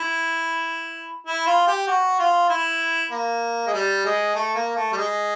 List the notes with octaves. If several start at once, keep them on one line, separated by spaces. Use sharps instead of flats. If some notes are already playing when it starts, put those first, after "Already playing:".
Already playing: E4
E4
F4
G4
F#4
F4
E4
A#3
G#3
G3
G#3
A3
A#3
A3
G3
G#3